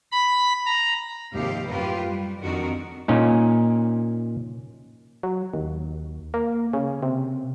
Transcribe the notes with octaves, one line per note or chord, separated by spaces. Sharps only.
B5
A#5
D#2 G#2 C3 F3 G4 F5
F#2 A2 F4 G4 A#4 B4
G3
F2 D#3 C4 D4 F#4 A#4
A#2 C#4 D#4
F#3
D#2
A#3
C#3
C3